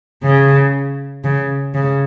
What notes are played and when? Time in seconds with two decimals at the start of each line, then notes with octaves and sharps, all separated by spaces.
0.23 C#3
1.24 C#3
1.74 C#3